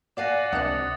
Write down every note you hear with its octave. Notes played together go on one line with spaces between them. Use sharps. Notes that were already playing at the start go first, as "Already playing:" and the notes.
D5 F5 F#5 G#5 D6 A6 A#6
C#2 C3 D4 D#6 F#6 A6 C#7